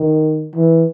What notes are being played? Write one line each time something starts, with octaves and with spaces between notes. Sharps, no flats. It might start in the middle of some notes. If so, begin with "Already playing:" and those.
Already playing: D#3
E3